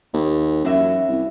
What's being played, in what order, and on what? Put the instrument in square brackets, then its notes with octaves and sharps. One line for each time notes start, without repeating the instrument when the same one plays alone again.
[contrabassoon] D#2
[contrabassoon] F#2 [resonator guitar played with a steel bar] E3 F#3 E5
[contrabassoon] C2